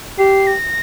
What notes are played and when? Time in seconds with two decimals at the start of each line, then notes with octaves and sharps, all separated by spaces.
0.18 G4 C7
0.47 A#6